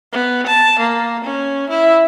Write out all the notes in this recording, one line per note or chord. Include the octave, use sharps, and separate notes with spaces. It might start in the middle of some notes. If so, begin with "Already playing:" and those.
B3
A5
A#3
C#4
E4